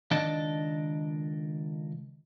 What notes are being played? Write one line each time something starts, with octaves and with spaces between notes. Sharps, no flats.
C#2 D#3 D4 D5 D#5 A5